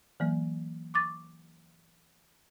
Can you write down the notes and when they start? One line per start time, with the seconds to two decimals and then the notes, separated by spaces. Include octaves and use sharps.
0.20 E3 F#3 A#3
0.94 C#6 D6 A6